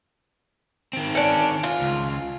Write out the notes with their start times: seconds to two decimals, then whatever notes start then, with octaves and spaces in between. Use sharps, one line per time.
0.93 D#3 C4
1.15 C#4 D4
1.63 F4
1.82 C#2